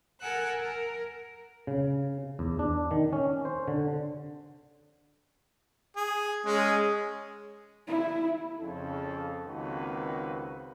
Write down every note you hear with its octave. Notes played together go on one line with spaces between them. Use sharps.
A4 A#4 F#5 G#5 E6 F#6
A#4
C#3
E2
D4
D#3
C#4
C5
D3
G#4
G#3 C#4 G#4
E4
F2 C#3 A4
C#2 D#3 A#3 C4 F#4 B4